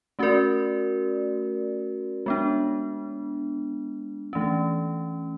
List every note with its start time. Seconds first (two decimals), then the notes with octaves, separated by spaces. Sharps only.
0.19 A3 C#4 F#4 A#4 D5
2.26 G#3 B3 D4
4.33 E3 A3 C#4